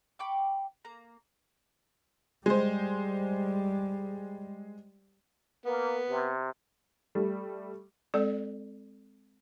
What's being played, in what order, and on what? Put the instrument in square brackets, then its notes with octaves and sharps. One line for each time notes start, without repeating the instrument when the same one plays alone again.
[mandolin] G5 B5 C#6 D6
A#3 A#5
[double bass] G3 [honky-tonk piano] G#3 C5
[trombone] A#3 [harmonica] B3
[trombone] C3
[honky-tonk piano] G3 A3
[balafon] G#3 C4 A4 D5